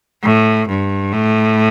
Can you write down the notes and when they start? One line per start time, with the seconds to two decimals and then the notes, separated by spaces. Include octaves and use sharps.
0.24 A2
0.68 G2
1.13 A2